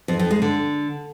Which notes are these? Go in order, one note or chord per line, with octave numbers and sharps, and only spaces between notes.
F2
F2
G#3
D3